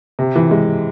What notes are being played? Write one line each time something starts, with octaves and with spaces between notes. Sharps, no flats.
C3
E3
G#3